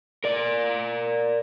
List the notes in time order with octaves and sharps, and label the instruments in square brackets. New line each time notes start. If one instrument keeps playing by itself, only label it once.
[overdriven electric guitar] A#4 D5